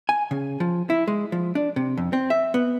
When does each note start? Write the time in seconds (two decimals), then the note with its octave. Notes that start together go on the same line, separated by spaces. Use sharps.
0.09 G#5
0.31 C#3
0.60 F3
0.90 E4
1.08 G#3
1.32 F3
1.55 D4
1.76 C3
1.98 F2
2.13 C4
2.30 E5
2.54 B3